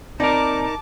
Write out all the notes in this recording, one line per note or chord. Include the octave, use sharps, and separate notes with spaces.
A#3 C4 D#4 A#4 D5 A5 D6